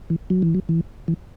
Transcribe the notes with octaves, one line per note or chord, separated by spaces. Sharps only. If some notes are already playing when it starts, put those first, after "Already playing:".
E3
F#3
E3
F#3
E3
E3